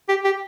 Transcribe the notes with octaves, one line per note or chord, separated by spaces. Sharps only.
G4
G4